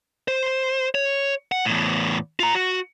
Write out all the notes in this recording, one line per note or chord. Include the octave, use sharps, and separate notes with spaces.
C5
C#5
F#5
E2 A2
F4 A#5
F#4